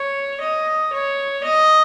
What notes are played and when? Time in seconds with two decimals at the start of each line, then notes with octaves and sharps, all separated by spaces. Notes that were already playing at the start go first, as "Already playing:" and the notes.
Already playing: C#5
0.41 D#5
0.93 C#5
1.44 D#5